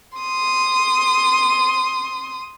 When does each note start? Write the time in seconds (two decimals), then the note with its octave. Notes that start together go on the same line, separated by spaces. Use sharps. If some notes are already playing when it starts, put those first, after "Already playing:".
0.18 C6 D#6